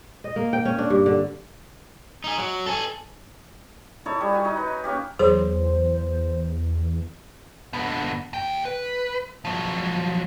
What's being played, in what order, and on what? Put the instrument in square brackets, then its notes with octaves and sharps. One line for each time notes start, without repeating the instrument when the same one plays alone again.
[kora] D#5
A#3
G5
C#4
D4
G2
D3
[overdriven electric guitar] D#4 G#4
F#3
A4 G#5
[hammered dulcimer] D#4 E4 A4 C#5
G3
F#4 G#5
D#4
B4
A#3 C#4 G4
[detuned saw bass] E2 [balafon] F#3 G#4 C#5 [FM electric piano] C5
[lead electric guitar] D3 B3
D#2 G5
B4
F3 F#3